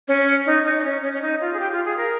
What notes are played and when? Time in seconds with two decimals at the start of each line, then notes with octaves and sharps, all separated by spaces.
0.08 C#4
0.46 D#4
0.65 D#4
0.79 D#4
0.84 C#4
1.03 C#4
1.13 C#4
1.22 D#4
1.41 F4
1.53 G#4
1.60 G4
1.72 F4
1.85 G#4
1.97 A#4